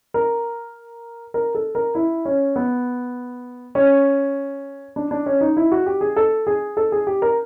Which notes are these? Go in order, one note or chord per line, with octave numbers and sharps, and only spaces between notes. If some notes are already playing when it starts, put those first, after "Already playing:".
A#4
A#4
A4
A#4
E4
C#4
B3
C#4
D4
D4
C#4
D#4
E4
F#4
G4
G#4
A4
G#4
A4
G#4
G4
A#4